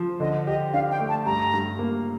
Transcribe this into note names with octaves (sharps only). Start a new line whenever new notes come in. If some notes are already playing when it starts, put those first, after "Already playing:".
Already playing: F3
D3 D#5
G4 D#5
D4 F5
G5
A3
A5
G2 A#5
G2
A#3